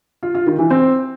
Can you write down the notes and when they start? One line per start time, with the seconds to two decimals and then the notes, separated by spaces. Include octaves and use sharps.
0.23 F4
0.35 F4
0.47 D#3
0.59 E3
0.70 C4